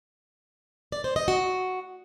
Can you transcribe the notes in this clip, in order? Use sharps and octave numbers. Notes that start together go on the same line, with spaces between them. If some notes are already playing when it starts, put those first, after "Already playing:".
D5
C5
D#5
F#4